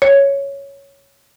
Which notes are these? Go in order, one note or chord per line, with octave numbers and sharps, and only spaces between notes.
C#5